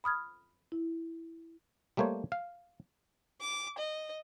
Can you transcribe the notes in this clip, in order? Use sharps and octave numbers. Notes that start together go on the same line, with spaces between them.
B5 D#6 F6 G#6
E4
G3 A3 A#3 C5 C#5
F5
D6
D#5